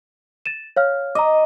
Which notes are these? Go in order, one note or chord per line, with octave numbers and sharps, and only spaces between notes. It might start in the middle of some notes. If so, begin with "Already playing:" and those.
A6 D#7 E7
C#5 F5 F6
D#5 A#5 D6